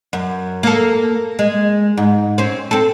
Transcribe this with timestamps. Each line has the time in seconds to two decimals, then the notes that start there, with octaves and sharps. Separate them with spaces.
0.13 F#2
0.63 A#3 A4
1.39 G#3
1.97 G#2
2.38 C4 C#4
2.71 C4 A4